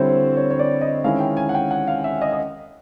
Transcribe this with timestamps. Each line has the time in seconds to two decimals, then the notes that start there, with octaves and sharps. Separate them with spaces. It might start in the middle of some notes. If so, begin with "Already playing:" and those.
Already playing: D3 G3 C4 E4 C5 C#5
0.37 C#5
0.50 C#5
0.59 D5
0.81 D#5
1.04 D#3 G#3 C#4 E4 F5
1.20 G5
1.37 G#5
1.49 F#5
1.55 G5
1.71 F#5
1.88 F5
2.04 E5
2.21 D#5
2.32 D#5